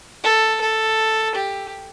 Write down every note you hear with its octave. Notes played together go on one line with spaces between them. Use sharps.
A4
A4
G4